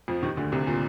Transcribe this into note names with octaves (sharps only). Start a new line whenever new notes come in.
F2 F3
D#2 D#3
D2 D3
C2 C3
A#2